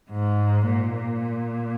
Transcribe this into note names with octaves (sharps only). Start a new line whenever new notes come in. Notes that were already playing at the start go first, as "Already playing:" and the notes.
G#2
A#2